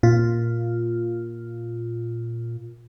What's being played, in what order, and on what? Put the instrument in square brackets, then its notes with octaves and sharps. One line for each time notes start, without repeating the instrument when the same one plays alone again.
[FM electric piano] A#2 F4